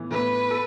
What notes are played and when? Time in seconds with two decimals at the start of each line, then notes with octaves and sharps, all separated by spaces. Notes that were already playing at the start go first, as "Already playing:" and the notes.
Already playing: A2 E3 B3
0.11 A2 E3 B3 B4
0.51 A4